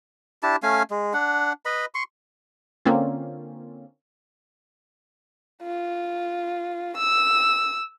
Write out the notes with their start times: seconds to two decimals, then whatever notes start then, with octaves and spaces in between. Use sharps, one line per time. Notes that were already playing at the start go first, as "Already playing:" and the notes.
0.43 D4 E4 G4 A5
0.63 A3 C#4 F5 G#5
0.90 G#3
1.14 D4 F#5
1.65 B4 D#5 B5
1.94 C6 C#6
2.85 D3 A#3 C4 C#4 F4
5.63 F4
6.98 E6